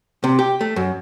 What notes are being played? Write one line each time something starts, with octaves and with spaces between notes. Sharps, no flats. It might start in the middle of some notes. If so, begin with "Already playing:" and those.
C3
G4
A3
F#2